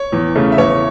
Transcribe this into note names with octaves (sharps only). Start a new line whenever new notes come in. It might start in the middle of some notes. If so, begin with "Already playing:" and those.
Already playing: C#5
E2
C#3 A3 C#4
E5
E2 C#5